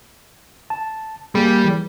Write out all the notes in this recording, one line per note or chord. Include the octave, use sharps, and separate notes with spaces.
A5
G3 A#3 G#4
E3